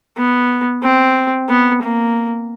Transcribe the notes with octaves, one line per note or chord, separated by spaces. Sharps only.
B3
C4
B3
A#3